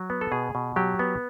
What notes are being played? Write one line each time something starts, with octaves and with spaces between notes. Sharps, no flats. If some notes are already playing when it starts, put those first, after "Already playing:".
Already playing: F#3
B3
A4
B2 G#4
B2
F#3 G4
B3